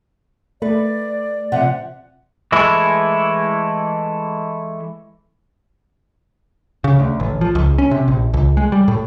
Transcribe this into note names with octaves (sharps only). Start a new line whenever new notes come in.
A3 B4 D5
C3 F3 F#5
E3 G#3 A3 E4
C#3
D2
A1
F3
C#2
C#4
C3
A#1
C#2
G#3
G3
A2